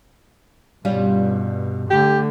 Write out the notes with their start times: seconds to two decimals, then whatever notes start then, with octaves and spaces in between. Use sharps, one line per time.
0.85 G2 B2 G3 C#4 F4
1.90 D3 A3 G4